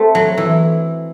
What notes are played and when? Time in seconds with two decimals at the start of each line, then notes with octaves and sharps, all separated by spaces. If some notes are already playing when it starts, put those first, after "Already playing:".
Already playing: A3 C4
0.15 F#3
0.38 E3